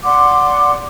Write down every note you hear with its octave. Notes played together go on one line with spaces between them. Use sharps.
D5 F#5 C6 D6